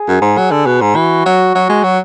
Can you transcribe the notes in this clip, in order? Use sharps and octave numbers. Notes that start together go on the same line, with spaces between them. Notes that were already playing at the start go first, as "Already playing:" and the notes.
Already playing: G#4
F#2
G#2
F#3
D3
B2
G#2
E3 F#4
F#3
F#3
G#3
F#3